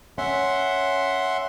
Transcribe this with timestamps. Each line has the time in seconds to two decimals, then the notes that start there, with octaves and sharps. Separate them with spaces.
0.18 C#4 E5 F#5 C6